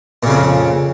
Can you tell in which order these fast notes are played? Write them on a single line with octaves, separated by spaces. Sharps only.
A#2 C#3 F2